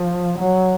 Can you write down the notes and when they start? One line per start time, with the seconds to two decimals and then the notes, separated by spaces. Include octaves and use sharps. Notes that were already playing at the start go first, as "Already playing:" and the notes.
Already playing: F3
0.39 F#3